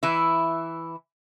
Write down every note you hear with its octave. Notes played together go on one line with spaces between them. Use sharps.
E3 E4